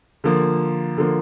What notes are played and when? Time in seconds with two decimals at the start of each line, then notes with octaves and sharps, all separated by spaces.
0.24 D3 F3 A#3
0.98 D3 F3 A#3